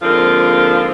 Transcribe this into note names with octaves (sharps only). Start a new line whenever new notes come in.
G#2 D3 F3 A#3 C4 F4